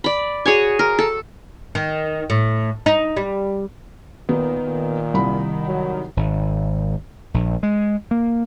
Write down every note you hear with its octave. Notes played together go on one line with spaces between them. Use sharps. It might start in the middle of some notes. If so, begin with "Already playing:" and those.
D5 B5
F#4 G#4 C#5 G#5
A#4
A4
D#3
A2
D#4
G3
A#2 D#3 B3
A#2
C2 B5
F#3
G#1
A#1
G#3
A#3